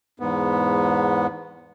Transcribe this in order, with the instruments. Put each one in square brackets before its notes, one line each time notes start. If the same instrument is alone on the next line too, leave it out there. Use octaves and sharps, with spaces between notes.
[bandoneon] E2 G#2 B3